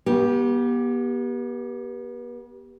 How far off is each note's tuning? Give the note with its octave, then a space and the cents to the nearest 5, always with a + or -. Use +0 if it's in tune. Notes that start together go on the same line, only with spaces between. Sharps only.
B3 -40 G4 +0